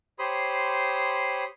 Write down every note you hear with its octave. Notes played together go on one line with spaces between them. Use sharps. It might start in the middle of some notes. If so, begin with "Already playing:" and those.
G4 C5 C#5 B5 C6 D#6